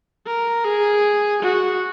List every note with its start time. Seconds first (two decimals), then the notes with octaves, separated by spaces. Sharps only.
0.27 A#4
0.65 G#4
1.42 F#4